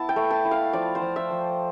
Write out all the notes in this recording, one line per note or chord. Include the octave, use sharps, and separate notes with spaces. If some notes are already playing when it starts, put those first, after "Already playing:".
Already playing: B3 E4 A5
G5
A3
A5
E4
F5
F3 D5
C5
F3
E5
F3